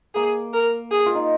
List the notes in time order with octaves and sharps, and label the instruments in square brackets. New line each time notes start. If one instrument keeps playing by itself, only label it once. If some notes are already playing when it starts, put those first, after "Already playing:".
[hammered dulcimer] A#3 [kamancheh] G#4
[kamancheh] A#4
G#4
[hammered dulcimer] F4
D#4